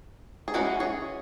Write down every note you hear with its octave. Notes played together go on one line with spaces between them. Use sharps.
G#4
E3 G#3 C#4 F#4 B4
G#4 C#5